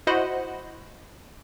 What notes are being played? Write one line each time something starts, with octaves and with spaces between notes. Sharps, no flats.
E4 F#4 C5 D#5 F#5 B5